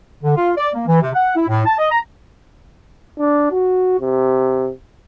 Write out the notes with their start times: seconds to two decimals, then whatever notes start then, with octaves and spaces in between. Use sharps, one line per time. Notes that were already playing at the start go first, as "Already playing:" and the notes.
0.23 D3
0.36 F4
0.57 D5
0.74 A#3
0.87 E3
1.01 C3
1.15 F#5
1.36 E4
1.48 A2
1.66 A5
1.79 D#5
1.91 A#5
3.19 D4
3.51 F#4
4.00 C3